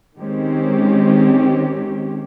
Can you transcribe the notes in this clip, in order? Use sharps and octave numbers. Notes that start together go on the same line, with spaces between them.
D#3 G#3 C4 C#4 G4